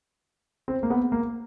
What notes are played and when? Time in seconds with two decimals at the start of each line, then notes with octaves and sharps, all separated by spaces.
0.68 C4
0.83 A#3
0.90 B3
1.12 A#3